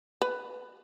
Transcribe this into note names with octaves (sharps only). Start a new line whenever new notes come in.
B4